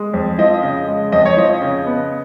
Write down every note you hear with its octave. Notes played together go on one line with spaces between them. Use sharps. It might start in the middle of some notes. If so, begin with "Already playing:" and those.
Already playing: G#3
F2
F3 D#5
C#3
G#3
F2 D#5
C#5
F3 D#5
C#3
B3